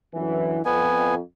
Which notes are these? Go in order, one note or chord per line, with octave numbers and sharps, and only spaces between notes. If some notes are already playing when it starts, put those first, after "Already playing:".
F#2 D3 E3
F2 B3 G#5